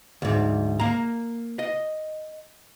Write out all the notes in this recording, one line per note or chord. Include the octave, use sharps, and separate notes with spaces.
D2 G#2
A#3 A#5
D#5